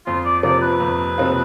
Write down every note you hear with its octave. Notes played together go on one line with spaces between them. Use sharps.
F2 F4
D5
C3 F3 C4 F4 D5
B4
F2
C3 F3 C4 F4